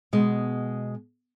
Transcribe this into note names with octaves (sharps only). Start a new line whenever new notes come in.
B2 G#3